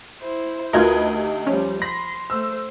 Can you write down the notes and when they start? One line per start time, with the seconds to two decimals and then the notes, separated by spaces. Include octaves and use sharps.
0.20 E4 C5
0.73 D2 D#4 F4 F#4 A#4 B4 D#5 G#6
1.15 G4
1.47 F3 G3 C#4
1.82 B5 C6 A#6
2.30 A3 C5 E6